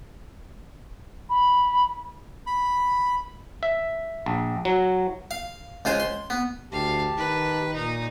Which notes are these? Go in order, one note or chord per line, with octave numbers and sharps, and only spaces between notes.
B5
B5
E5
A#1
F#3
F5
C#2 F4 C5 G#5
C6
B3
D2 G4 F5 A5
D#3 B4
A#2 D#4